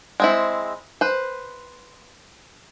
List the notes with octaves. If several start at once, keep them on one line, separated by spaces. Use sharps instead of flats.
G#3 C4 E4
B4 C5